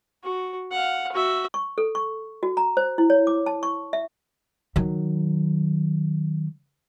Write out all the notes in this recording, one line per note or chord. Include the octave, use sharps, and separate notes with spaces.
F#4
F5 F#5
F#4 E5
C#6
A4
C#6
F#4
A#5
C5
E4
C#5
D6
A5
C#6
E5
D#3 F#3